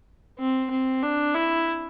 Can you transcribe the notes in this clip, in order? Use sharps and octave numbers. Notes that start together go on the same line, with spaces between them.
C4
C4
D4
E4